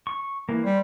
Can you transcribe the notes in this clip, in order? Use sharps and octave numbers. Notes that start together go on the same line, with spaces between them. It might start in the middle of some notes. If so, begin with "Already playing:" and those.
C#6
E3 A#3
G3 C5